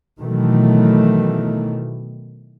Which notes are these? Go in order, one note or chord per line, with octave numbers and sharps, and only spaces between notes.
B2 D#3 E3 F#3 A3